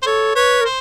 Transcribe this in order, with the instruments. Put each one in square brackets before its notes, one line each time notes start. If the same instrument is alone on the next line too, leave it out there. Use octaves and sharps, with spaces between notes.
[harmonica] C5
[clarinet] A4 [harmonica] C#5
[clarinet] B4 [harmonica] C#5
[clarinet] A#4
[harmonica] C5